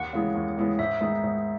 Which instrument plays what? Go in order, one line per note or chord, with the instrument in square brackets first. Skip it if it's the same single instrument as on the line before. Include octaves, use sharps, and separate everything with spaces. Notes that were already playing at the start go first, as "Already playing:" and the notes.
Already playing: [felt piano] D#2 [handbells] F#5
[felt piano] C#3 E3 G#3 B3
D#2
C#3 E3 G#3 B3
[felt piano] G#2 [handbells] E5
[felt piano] D#3 G#3 B3 D#4
G#2